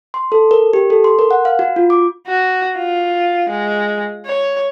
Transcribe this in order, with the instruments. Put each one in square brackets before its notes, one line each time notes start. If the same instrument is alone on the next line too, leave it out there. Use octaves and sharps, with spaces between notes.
[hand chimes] C6
A4
A#4
G4
A4
C6
A#4
F#5
F5
F#4
F4
D6
[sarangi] F#4
F4
G#3
C#5